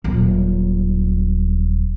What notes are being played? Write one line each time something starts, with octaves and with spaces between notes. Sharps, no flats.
D#1 F#3